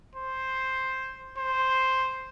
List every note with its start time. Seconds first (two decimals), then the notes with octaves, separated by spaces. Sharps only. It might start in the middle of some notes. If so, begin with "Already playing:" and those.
0.16 C5
1.37 C5